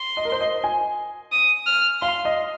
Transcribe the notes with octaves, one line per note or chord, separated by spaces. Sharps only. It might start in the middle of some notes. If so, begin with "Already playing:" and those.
Already playing: C6
D#5
A#4
C5
D#5
G#5
D#6
F6
F5 C6
D#5